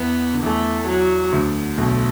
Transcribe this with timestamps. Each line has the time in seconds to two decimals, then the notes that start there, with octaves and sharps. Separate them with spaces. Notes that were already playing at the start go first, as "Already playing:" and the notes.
Already playing: E2 E3 B3
0.34 D3
0.43 E2 E3 A3
0.88 F#3
1.32 D2 D3
1.78 B1 B2 A3